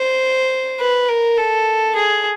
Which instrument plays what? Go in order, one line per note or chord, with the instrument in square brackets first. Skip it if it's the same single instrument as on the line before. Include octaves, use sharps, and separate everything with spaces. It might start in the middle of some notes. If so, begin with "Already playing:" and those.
Already playing: [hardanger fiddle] C5
B4
A#4
A4
G#4